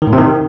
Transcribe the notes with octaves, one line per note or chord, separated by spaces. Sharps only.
D#3
A2
C3
D#3